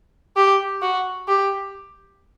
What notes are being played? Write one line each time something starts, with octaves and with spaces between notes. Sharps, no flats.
G4
F#4
G4